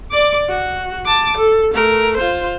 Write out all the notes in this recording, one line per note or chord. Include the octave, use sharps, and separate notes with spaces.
D5 D6
F#4
A5 D6
A4
A3 A#4
F4 C5